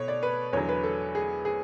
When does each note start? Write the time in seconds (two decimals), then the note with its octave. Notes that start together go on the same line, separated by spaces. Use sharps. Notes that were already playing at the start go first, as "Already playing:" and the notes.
Already playing: B2 A3 C#5
0.08 D5
0.23 B4
0.53 E2 D3 F#3 C#5
0.69 B4
0.83 A4
1.15 G#4
1.45 G#4